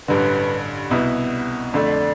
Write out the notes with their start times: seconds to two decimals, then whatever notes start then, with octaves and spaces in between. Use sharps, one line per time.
0.08 A1 G2 D3 B4
0.90 C2 B2 B3 E4
1.74 F2 D3 A3 D5